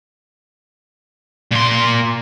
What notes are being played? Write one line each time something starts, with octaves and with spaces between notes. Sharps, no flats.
A#2 C6